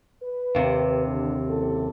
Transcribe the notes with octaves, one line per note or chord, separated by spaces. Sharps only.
B4
D#2 C3
D3
F#1 A4